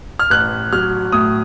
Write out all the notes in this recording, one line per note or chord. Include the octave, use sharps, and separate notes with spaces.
F6
A1 F#6
F#3 F6
A2 D#6